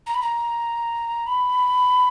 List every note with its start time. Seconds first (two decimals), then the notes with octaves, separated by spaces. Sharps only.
0.06 A#5
0.14 B5
0.22 A#5
1.26 B5